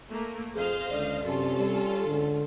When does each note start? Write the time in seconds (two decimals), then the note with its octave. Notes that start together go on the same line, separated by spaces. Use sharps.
0.10 A3 A#3
0.55 F2 G#4 C5 D#5 F5
0.90 C#2 D3 D5
1.23 F#2 C3 C#4 F4 A4
1.57 G3
2.06 C#2 G#2 D3